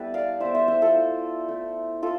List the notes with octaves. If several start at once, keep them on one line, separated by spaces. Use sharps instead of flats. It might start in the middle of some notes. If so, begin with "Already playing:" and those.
Already playing: G3 B3 E4 A4 B4
D5 F5
G3 B3 E4 C5 E5
C5 E5
C5 E5
F4 A4
A3 E4
A3 E4
E4 F4 A4